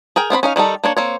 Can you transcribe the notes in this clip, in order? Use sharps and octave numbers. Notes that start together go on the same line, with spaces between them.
G#4 A#4 G5
B3 C4 F5 B5
C#4 D#4 F5
D#3 G3 D#4 A4
A#3 D4 C#5
A#3 C4 C#5